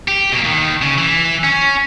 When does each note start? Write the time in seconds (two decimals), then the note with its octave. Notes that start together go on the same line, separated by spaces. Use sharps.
0.08 G4
0.32 B2 A#3
0.44 D#2 D#3
0.82 C#3
0.98 E3
1.44 C#4